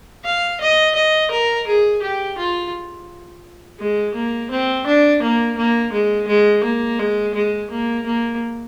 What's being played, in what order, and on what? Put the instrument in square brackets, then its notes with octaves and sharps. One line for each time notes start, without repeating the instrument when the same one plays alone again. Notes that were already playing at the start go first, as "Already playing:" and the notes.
[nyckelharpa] F5
D#5
D#5
A#4
G#4
G4
F4
G#3
A#3
C4
D4
A#3
A#3
G#3
G#3
A#3
G#3
G#3
A#3
A#3